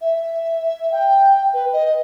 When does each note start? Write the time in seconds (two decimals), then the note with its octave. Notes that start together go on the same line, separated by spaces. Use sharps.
0.01 E5
0.92 G5
1.54 B4
1.73 D#5